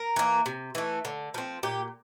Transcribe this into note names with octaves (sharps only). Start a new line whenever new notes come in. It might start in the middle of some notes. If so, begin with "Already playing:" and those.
Already playing: A#4
E3 A#3
C3
E3 A3
D3
F3 C4
A#2 G4